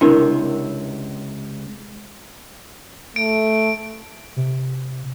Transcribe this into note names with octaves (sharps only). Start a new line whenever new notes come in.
C#2 C3 D4 E4 A#4
A3 D7
C3